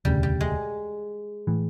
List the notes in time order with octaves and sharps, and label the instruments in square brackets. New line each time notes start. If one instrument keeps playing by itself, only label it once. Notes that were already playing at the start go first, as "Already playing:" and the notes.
[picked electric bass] E1 D2 C#3 [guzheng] G3
[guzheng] G3
G#3
[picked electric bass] A2 E3